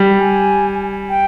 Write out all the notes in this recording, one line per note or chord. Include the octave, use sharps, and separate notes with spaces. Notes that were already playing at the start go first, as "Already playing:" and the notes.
Already playing: G3
G#5
G5